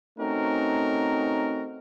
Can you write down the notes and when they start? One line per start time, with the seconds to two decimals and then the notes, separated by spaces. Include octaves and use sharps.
0.19 A3 C4 C#4 D#4 F#4 A#4